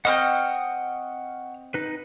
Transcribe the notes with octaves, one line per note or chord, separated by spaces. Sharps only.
C4 C#4 D#5 F#5 C#6 F6
D#4 B4